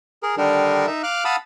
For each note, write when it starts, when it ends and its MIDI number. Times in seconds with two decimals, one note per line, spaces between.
0.23 0.35 68
0.23 0.35 70
0.37 0.86 50
0.37 0.86 51
0.37 0.86 55
0.37 0.86 62
0.37 0.86 63
0.37 0.86 70
0.87 1.02 63
0.87 1.02 76
1.03 1.24 77
1.03 1.24 86
1.03 1.24 89
1.03 1.24 90
1.25 1.36 77
1.25 1.36 78
1.25 1.36 81
1.25 1.36 83
1.25 1.36 87
1.25 1.36 88